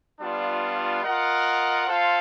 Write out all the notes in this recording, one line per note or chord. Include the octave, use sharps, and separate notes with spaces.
G3 B3 D4 F4
F4 A#4 D#5 F#5
F4 A4 C5 F5